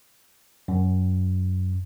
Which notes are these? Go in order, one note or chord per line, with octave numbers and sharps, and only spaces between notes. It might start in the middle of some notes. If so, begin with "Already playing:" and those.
F#2